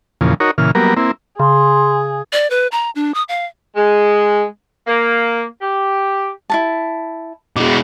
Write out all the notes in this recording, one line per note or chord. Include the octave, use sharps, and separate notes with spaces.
E2 A#2 C#3 F3
D#4 F#4 A#4 C#5
A#2 C#3 E3 F6
F#3 G3 A#3 B3 A#4
A#3 C4 E4
C#3 G#4 C6
D5
B4
A#5
D4
D#6
F5
G#3
A#3
G4
E4 F#4 A5
B2 G#3 D6